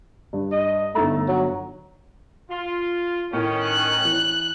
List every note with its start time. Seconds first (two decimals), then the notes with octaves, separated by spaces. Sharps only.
0.33 G2
0.52 D#5
0.95 G1 A3 D#4 A#5
1.28 F#3
2.50 F4
3.33 A2 D#3 C#4
3.64 F#6
4.05 E3